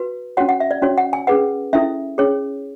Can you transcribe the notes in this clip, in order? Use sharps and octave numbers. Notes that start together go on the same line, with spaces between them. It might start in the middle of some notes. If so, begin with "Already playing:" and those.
Already playing: F#4 B4
C#4 F#4 C#5 F#5
F#5
E5
D5
C#4 F#4 C#5
F#5
G#5
C#4 G#4 B4 F#5
C#4 E4 A4 E5
C#4 G#4 C#5